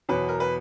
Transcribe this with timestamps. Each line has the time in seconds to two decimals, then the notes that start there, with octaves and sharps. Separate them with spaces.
0.09 E2 B2 F#3 B4
0.29 A#4
0.40 B4